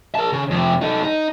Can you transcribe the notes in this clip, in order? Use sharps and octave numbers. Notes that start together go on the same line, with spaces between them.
A#4 A5
C#3
F2 C3
D#4 A4
D#4